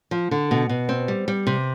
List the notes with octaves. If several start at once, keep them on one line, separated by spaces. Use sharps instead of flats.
F3
D3
B2
B2
C4
G3
G3
C3